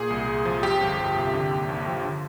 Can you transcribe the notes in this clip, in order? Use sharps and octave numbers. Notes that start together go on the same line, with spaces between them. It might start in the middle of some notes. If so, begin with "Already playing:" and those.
Already playing: A#2 G#4
C2
C2
F3
F2 G4
G1
G1
C3
D3
D#2
D#2
F3
D3